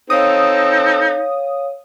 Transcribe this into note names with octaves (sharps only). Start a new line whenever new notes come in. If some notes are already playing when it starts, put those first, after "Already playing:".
C4 D#4 A4 C#5 F5 D#6